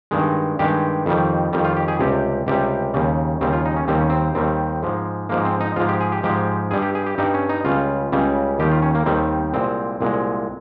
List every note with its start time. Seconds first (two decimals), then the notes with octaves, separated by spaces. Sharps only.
0.11 G2 D#3 G#3
0.59 G2 D#3 G#3 G4
1.06 F2 D#3 G3
1.53 F2 D#3 G3
1.65 F4
1.77 G4
1.88 G#4
1.99 C#2 C3 G3 G4
2.47 C#2 C3 G3 G4
2.94 D#2 C#3 G3
3.41 D#2 C#3 G3 C4
3.53 F4
3.66 D#4
3.76 C#4
3.88 D#2 D#3 G3 C4
3.98 C#4
4.10 C4
4.35 D#2 D#3 G3 C4
4.83 G#2 F3 G#3
5.29 G#2 F3 G#3 A#3
5.45 C4
5.61 D#4
5.76 G#2 F3 G#3 F4
5.89 G4
6.01 G#4
6.12 G4
6.23 G#2 F3 G#3 G4
6.71 G2 G3 G#4
6.82 G4
6.95 G#4
7.06 G4
7.18 G2 G3 D#4
7.34 C#4
7.49 D#4
7.65 C#2 C#3 G3 F4
8.12 C#2 C#3 G3
8.59 D#2 D#3 G3 G4
8.71 F4
8.82 C#4
8.95 A#3
9.06 D#2 D#3 G3 C4
9.53 C2 A#2 G#3 C4
10.01 C2 A#2 G#3